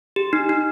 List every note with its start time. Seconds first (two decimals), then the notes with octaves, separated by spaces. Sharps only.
0.16 G4
0.33 D#4
0.49 D#4